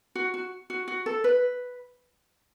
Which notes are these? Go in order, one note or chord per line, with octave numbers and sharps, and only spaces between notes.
F#4
F#4
F#4
F#4
A4
B4